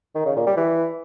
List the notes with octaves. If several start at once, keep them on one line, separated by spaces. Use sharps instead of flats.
D#3
C#3
A#2
G3
E3